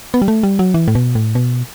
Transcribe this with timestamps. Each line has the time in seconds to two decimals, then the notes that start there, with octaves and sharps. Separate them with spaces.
0.14 B3
0.22 G3
0.28 A3
0.43 G3
0.59 F#3
0.74 E3
0.88 A2
0.95 B2
1.15 A2
1.35 B2